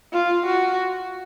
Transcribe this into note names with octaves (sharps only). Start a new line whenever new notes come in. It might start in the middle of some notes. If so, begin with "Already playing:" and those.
F4
F#4